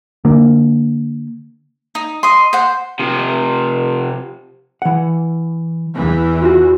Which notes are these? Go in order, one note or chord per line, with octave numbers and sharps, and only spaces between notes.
D3 A#3
D#4
D#5 C6
C5 F#5
C3 F3
E3 F#5
E2 E3
F4 F#4